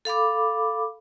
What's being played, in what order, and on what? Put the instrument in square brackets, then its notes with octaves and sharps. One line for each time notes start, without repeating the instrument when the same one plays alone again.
[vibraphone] A4 F5 B5 D6